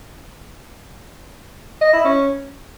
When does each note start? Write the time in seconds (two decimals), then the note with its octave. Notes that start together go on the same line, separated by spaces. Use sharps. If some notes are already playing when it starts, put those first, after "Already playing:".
1.81 D#5
1.93 E4
2.04 C#4